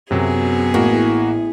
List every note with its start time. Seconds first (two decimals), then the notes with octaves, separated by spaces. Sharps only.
0.11 F#2 C3 F#3 B3 G#4
0.74 A1 A2 A#3 F#4